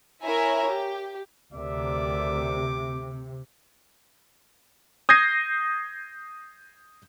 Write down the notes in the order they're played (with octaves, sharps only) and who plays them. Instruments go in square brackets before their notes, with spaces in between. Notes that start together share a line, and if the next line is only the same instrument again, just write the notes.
[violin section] E4 A#4 C#5 E5 G#5 A#5
G4
[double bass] D2 [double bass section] C3 [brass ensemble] A#4 D5 E5 [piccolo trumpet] D6
[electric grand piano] D#6 G6 G#6 A#6 C7 D#7